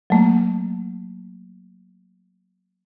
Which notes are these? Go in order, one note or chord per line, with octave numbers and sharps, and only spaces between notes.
F#3 A3 A#3